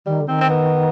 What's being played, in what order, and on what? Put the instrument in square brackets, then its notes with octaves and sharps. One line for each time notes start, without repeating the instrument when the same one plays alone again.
[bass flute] D#3 [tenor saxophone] G3
[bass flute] D3
[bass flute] D#3 [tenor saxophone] C4
[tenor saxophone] C4
B3